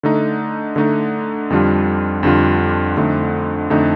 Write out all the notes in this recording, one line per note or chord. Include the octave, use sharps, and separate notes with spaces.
D3 A3 D#4
D3 A3 D#4
F2 D3 G3 D4 F4
F2 D3 G3 D4 F4
F2 D3 A3 D#4
F2 D3 A3 D#4